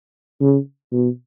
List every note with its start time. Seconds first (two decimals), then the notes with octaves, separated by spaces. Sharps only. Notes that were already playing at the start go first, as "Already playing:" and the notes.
0.41 C#3
0.92 B2